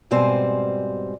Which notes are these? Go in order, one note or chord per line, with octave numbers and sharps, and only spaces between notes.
G#2 B2 G3 C4 C5 G#5